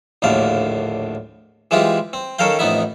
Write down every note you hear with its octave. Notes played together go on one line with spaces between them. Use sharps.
A#1 D#2 A2 D3 F5
E3 G#3 C4 E4 F4 G4
C4
D#3 C#4 A4 A#4 F5 G5
A1 F2 B3 D#4 E4 E5